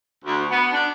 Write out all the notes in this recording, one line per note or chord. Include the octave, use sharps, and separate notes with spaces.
D2
B3
D4